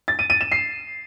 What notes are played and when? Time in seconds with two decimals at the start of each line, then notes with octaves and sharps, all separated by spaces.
0.08 A6
0.19 D#7
0.30 D#7
0.41 E7
0.52 C7